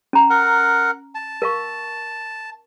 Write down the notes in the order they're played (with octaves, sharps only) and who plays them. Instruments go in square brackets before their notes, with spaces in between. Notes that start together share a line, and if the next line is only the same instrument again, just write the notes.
[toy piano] C#4 A#5
[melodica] A#4 F#5
A5
[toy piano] A#4 F5 C#6